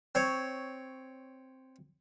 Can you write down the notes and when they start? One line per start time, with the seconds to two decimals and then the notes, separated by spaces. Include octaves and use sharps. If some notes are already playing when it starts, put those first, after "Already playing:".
0.15 C4 C#5